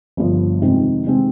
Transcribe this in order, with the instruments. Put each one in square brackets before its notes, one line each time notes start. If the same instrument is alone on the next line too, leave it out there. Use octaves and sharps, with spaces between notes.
[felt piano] G1 G2 F3
F2 C3 D#3 G#3 C4
C3 D#3 G#3 C4